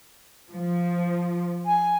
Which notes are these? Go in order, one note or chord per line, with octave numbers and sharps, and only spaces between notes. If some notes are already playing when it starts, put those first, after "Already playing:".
F3
G#5